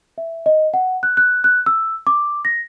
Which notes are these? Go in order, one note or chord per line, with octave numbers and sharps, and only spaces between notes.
E5
D#5
F#5
F#6
F#6
F#6
E6
D6
A#6